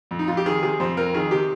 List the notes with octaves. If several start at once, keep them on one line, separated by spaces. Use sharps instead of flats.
F2
D#4
F2 F4
G4
D#3 G#4
C3 G#4
F2 C5
F2 A#4
D#3 G#4
C3 G4